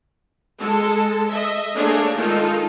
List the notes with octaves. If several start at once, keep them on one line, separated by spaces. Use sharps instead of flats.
G#3 A4
D#5 E5
A3 A#3 D4 G#4 C#5
D#3 G#3 D#4 F4 A4